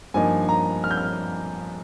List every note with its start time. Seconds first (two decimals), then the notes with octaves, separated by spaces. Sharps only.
0.14 G2 F3 A#3 D#4 G#5
0.49 A#5
0.84 F6
0.91 G6
0.98 F6